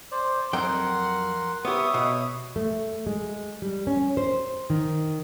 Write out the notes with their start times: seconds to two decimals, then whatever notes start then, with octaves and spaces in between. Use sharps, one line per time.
0.12 C5 D5
0.53 F2 F#3 A#4 F#5 G5 C6
1.65 B3 G4 C#5 E5 D#6
1.94 B2
2.56 A3
3.06 G#3
3.62 G3
3.87 C#4
4.17 C5
4.70 D#3